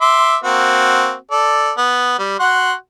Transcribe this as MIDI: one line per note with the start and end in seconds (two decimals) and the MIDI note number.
0.01 0.36 76
0.01 0.36 84
0.01 0.36 86
0.44 1.15 58
0.44 1.15 60
0.44 1.15 66
1.31 1.72 69
1.31 1.72 74
1.77 2.17 59
2.19 2.39 55
2.39 2.73 66
2.39 2.73 78
2.39 2.73 84